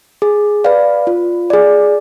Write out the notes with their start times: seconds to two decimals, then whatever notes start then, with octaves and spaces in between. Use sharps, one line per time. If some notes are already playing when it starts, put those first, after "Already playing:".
0.22 G#4
0.64 B4 D5 F5
1.07 F4
1.50 G#4 D5